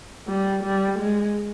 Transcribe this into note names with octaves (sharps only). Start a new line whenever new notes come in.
G3
G3
G#3